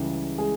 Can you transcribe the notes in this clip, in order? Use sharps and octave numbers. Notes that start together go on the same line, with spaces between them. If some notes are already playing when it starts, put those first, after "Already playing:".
Already playing: C#2 C#3 E3 G3
G#3 G#4